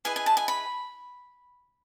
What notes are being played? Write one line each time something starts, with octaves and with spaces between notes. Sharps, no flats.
E4 G#4 B4 D#5 G#5
G#5
A5
G#5
B5